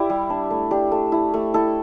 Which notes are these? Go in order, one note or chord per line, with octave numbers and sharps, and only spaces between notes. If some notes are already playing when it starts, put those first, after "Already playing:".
Already playing: E4 G4 D5
G3
D4
A3
D4 G4
A3
E4
A3
E4 A4